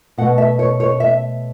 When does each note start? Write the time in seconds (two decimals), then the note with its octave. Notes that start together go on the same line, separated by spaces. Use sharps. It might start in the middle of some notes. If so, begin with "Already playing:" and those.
0.18 B2 A3 F#5
0.38 E5
0.59 C#5
0.80 C#5
1.00 E5